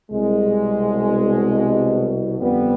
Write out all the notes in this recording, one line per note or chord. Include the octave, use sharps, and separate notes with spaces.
C2 B2 G#3
G1 F2 D3 F3 G3 B3